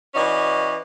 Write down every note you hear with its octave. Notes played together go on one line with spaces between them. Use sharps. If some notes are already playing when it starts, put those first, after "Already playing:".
E3 C#4 F#4 D5 D#5